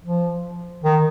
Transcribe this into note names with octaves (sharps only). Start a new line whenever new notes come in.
F3
D#3